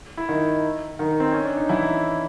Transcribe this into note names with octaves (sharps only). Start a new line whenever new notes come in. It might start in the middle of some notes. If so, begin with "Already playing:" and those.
E4
D#3 D#4
D#3 D#4
C4
C#4
D4
D#4
E3 E4